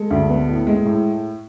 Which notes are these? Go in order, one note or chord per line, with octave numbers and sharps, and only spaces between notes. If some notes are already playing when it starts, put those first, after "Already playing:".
Already playing: G#3 A4
D2
B3
A2
G#3
A2